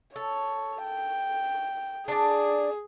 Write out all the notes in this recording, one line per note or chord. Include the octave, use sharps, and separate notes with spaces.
A4 C#5
G5
D4 G#4 D5